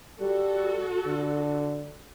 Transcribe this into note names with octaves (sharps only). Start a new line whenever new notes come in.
G3 F#4 A4
D3